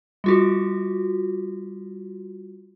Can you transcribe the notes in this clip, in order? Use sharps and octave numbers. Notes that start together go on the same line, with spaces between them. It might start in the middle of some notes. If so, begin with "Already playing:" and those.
G3 F4 F#4